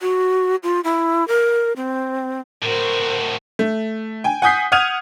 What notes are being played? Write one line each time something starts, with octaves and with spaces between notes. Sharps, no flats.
F#4
F4
E4
A#4
C4
A2 F#4 A#4 C5
A3
G5 G#5
F#5 G#5 D#6 G6 B6 C7
F#5 D#6 F6 G#6 D#7 F7